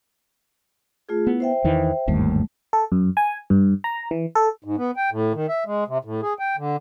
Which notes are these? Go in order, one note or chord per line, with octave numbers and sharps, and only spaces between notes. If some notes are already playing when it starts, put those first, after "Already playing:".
A3 F4 G#4
B3 E4
C5 E5 G5
E2 D#3 E3
G1 D#2 G#2 G3 A3
A4
F#2
G#5
G2
A#5
E3
A4
G#2
B3
G5
A2
D#3
E5
G#3
C3
A2
G#4
G5
D3